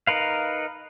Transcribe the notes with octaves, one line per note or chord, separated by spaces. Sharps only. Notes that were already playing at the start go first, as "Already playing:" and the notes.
D#4 A#4 B4 F5